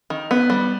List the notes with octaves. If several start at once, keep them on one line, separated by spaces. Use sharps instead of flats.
D#3
B3
G3